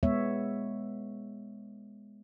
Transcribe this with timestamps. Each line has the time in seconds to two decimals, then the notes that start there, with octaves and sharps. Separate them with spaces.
0.03 G#3 B3 C#5 E5